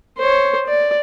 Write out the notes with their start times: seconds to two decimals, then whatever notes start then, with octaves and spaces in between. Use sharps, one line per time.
0.18 C5 C#5
0.67 D5